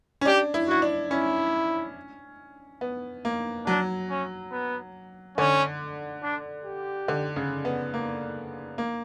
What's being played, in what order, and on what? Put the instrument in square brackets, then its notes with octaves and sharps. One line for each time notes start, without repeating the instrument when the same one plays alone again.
[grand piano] C#4
[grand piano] D4 [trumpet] G4
[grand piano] E4
[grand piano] E4 [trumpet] F#4
[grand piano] D4
[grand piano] C#4 [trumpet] E4
[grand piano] B3
A#3
[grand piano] F#3 [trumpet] D4
[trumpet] C#4
B3
[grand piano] D3 [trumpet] C#4
[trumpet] D4
G4
[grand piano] D3
C#3
B3
A#3
A#3